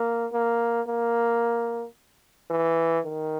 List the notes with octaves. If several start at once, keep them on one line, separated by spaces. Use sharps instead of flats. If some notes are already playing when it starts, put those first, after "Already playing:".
Already playing: A#3
A#3
A#3
E3
D#3